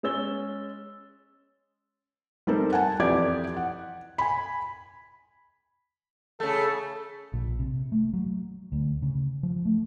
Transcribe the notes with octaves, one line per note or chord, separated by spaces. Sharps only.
G#3 C#4 E6 A6 G7
G3 C4 D#4 A4 A#4 C5
F#5 G#5 A5
F2 E3 G4 D5 D6 G#6
F#5
G#5 B5
C#3 A3 A4
A#1
C3
A3
F#3
D2
C#3
F3
A3